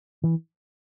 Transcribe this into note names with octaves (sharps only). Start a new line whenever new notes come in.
E3